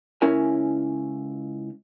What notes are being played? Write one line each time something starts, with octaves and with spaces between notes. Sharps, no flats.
C#2 C#4 E4 A#4 G#5